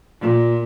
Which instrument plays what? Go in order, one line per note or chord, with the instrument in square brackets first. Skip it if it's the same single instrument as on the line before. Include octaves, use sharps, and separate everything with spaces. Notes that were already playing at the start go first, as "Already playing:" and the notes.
[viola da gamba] A#2